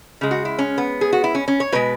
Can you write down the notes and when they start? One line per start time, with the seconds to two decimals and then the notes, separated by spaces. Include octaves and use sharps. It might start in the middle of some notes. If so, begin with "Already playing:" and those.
0.21 C#3 G#3
0.31 F#4
0.45 E4
0.59 C#4
0.78 B3
1.01 G#4
1.13 F#4
1.24 E4
1.35 C#4
1.48 C#4
1.60 C#5
1.72 B2 G#3 B4